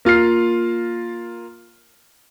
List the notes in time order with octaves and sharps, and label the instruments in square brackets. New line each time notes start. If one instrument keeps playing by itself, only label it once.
[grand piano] A#3 F4 F6 C7